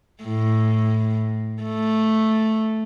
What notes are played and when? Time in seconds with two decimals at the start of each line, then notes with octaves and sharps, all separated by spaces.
0.24 A2
1.63 A3